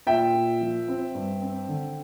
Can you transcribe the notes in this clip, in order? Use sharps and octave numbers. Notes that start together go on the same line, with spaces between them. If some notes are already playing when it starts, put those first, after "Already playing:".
A#2 E5 G5
A#2
F3
C4
G2
C4
D3